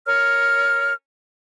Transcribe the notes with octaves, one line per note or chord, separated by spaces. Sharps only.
A#4 C#5 F6